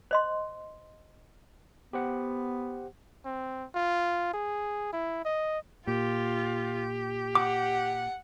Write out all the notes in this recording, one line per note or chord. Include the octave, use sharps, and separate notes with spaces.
C5 D#5 C6
B3 G4 C5 F#5
C4
F4
G#4
E4
D#5
A#2 F4 G4
F#5 D6